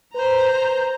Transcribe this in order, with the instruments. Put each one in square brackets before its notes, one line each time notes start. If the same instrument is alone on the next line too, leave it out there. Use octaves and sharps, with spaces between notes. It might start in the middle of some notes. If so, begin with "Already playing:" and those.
[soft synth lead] B4 [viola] C5 A#5